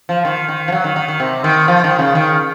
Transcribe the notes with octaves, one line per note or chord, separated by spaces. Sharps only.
F3
D#3
D#3
F3
F#3
D#3
D#3
D#3
C3
D#3
F3
D#3
C#3
D#3